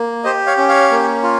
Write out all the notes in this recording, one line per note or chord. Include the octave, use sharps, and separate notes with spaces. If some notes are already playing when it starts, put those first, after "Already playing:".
Already playing: A#3
G4 C5 D#5
C#5 F5
C#4
C#5 F5
A#3
F4